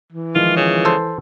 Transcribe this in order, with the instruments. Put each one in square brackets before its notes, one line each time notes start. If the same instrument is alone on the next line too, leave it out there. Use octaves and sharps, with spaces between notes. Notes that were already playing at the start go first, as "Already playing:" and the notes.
[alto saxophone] E3
[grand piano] D#3 F3 G#3 [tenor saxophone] F4
[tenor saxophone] C#3
[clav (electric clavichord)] A4 C5